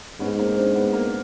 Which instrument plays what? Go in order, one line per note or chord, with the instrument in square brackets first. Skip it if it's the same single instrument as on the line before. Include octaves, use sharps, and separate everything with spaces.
[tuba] G#2 [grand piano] B3 C#4
[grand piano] A#3 C4
C4 D4
B3
A#3